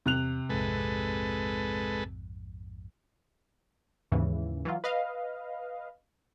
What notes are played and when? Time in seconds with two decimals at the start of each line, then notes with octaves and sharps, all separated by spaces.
0.06 E2 C3 F#6 F7
0.50 A#1 F2 G#2 G#3 A4 B4
4.12 D#2 G#2 C#3 E3
4.65 E3 F#3 F4
4.84 B4 D#5 F5